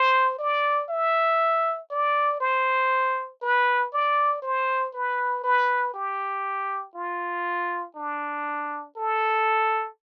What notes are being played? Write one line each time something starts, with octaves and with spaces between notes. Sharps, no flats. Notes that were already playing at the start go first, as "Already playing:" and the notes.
Already playing: C5
D5
E5
D5
C5
B4
D5
C5
B4
B4
G4
F4
D4
A4